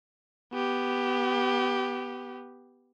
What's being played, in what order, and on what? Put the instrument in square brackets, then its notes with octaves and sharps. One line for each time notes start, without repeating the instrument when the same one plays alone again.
[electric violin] B3 G4